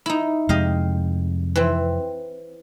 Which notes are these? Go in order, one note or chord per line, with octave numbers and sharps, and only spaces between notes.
D#4 E4
F2 C3 G#3 G4 D#5 F5
E3 C4